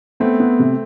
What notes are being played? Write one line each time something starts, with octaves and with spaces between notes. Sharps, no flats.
A3 B3 C4
B3
C3